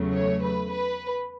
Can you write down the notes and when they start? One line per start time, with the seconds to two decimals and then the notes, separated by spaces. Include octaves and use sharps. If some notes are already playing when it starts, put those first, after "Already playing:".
Already playing: E2 C#3 F#3 A3
0.13 C#5
0.43 B4
0.72 B4